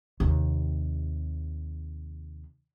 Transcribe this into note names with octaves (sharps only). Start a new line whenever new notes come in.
D#2 C3